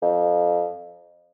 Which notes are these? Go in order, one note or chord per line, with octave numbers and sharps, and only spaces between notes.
F2